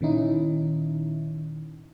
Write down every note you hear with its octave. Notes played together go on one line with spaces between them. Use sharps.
A#2 D#3 C#4 D#4 E4